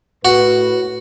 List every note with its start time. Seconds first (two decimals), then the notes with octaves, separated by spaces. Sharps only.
0.25 A2 F#4 B4